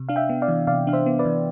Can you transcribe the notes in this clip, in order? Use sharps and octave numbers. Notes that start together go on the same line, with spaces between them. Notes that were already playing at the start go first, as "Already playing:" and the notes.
Already playing: C3
D4 F5
E5 G5
B3
D5 F5
E3
C3 D5 F5
D4 F5
C5 E5
B3
B4 D5
E3